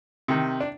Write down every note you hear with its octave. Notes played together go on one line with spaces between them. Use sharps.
C3 D#3
D4